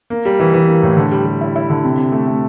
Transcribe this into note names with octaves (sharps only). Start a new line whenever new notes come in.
A#3
G3
E3
E3
A#3
A2
D3
G3
G3
E4
E4
D3
C3
C3
A3
A3